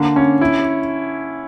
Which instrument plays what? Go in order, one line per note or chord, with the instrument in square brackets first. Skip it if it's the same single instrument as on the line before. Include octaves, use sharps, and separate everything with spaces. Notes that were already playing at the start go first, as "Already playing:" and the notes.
Already playing: [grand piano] D3 A#3
C#4
E4